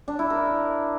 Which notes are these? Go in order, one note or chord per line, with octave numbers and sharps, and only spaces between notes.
D4
E4
A#4